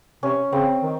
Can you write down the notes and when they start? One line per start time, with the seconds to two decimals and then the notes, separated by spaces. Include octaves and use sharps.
0.23 C3 C#4
0.52 C#3 C4
0.83 D#3